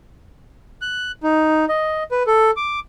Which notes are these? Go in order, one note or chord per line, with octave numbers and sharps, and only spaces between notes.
F#6
D#4
D#5
B4
A4
D6